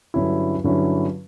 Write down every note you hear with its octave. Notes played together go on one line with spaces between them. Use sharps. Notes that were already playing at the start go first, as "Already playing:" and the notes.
G2 D3 F#3 C#4 E4
G2 D3 F#3 C#4 E4